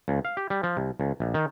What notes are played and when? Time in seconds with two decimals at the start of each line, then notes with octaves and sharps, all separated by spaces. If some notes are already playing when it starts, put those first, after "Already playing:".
0.08 C#2
0.25 F5
0.37 G4
0.50 G3
0.63 F3
0.77 C2
1.00 C#2
1.20 A#1
1.34 D#3